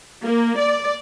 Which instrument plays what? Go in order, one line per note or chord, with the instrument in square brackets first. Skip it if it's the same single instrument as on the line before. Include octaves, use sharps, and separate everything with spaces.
[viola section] A#3
D5